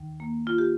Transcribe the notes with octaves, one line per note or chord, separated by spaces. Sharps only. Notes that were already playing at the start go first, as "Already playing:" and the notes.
Already playing: D#2 D#3
A#3
F4
G4